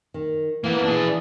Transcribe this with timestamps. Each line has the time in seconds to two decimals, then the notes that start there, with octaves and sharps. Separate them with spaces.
0.14 D#3
0.64 E3 A#3 B3
0.84 D4 G#4